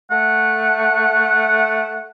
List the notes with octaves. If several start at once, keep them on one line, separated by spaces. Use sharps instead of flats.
A3 F#5